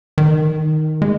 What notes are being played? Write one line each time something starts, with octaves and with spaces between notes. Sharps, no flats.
D#3
G#3